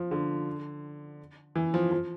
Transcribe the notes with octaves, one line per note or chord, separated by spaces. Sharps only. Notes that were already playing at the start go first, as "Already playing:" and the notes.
Already playing: F3
D3
E3
F3
F3